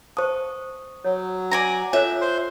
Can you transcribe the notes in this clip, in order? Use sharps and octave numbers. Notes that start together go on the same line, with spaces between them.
C5 A5 C#6 D#6
F#3 C#5
D5 G#5 A#5
F4 A4 C#5 E5 F#6
C5